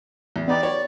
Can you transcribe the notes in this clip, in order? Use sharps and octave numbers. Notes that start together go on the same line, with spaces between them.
E2
B3 D#4 G4 D5
C#5